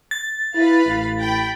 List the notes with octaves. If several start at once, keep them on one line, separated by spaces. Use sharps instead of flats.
A6
E4 B4 F5 B5
A1
G5 B5